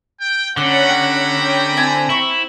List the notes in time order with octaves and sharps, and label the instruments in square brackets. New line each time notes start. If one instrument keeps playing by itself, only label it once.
[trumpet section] G5
[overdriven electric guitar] D3 [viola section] C#4 F#5 [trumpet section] A#5 B5 [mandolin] D6 F#6
[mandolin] G4
[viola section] C#4 G5
[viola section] C4 [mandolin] E4 G#5 A5
[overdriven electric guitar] E4 [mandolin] E5 C#6